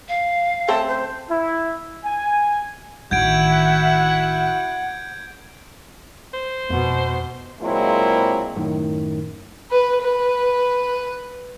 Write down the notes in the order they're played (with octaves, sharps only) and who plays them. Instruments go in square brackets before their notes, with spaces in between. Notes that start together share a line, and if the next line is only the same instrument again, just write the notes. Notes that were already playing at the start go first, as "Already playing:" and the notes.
[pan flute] F5
[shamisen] A3 C4 C#4 [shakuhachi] A5
[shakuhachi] C5
[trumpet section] E4
G#5
[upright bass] A1 D#3 [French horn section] E4 F#4 [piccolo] F#5 [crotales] G6 G#6 D7
[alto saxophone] C5
[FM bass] F2 [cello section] B2
[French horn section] A#2 F#3 G#3 A#3 C4 E4
[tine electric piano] F#2 A2 D#3
[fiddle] B4
B4